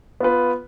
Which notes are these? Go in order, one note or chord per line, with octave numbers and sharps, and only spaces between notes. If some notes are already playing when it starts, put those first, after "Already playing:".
B3 F4 B4